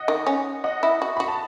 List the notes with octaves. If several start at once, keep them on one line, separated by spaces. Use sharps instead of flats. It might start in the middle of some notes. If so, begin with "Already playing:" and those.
Already playing: D#5 F#5
D#3
C#4
D#5 F#5
E4
F#4
F#4 B5
A5